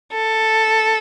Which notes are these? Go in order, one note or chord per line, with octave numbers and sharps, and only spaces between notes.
A4